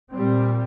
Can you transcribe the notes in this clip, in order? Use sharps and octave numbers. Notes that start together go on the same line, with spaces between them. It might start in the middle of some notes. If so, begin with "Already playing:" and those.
A#2 G3 C4